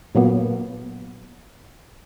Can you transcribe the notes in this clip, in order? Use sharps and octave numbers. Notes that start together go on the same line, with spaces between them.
A#2 F#3 A#3 B3